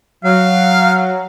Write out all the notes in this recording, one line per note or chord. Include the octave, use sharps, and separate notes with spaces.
F#3 F5